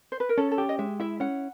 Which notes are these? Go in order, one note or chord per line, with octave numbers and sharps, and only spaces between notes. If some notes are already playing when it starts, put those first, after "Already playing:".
C5
B4
A#4
C#4 A4
A4
G4
D#5
G#3 E5
E4 E5
C#4 F#5